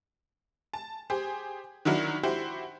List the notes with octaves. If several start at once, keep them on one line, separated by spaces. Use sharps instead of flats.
A5
G4 G#4 C5
D#3 F#3 D4 E4 F#4 A#4
E4 F#4 G4 C5